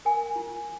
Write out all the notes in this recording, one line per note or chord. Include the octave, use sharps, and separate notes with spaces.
A#4 G#5
F4